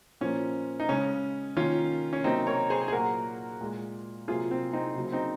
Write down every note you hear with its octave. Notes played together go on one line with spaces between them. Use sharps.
A#2 F3 A#3 C#4
D#4
C#3 G#3 C#4
D#3 A#3 C#4 F4
C#4
C3 F#3 A#3 C4 D#4
A#4 C#5
G#4 C5
G#4
A#2 F#3 A#3 F#4 A#4
A#2 G#3
C3 F#3 A#3 F4 G#4
C4
C4 D#4
C#3 F#3 A#3
C4 D#4